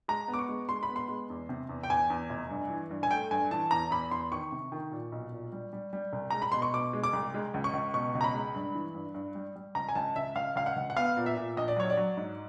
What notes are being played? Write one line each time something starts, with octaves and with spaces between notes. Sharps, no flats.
G#3 A#5
B3
D6
C#6
G#3
G#3 C6
B5
B3
C6
G#3
E2
C3
E2
G5
E2 G#5
E2
F1
G2
E3
G2
G#5
A3 G5
G2 G#5
E3 A5
E2 A#5
E2 B5
E2 C6
D#3 C#6
C3
D#3
A#2
B1
A#2
G3
G3
G3
C2
G#3 A#5
B5
B2 C6
C#6
B2 D6
G#3
D6
C2
G#3
C#2
C#6
C#2
B2 C#6
C#2
A#5
B5
G#3
G2
E3
G2
G2
G3
G3
C#2 A#5
G#5
C#2 A5
C#2 E5
C#2 F5
C#2 F5
F#5
C#2
F#5
B3 F5
A#2
E5
A#2
A#1 D#5
D5
F#3 C#5
D5
F#3
G#2